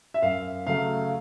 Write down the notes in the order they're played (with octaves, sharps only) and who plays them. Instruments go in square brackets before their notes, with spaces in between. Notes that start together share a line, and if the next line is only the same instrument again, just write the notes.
[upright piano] E5
[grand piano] F#2 [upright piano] F5
[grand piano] C#3 F#3 A3 [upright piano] F5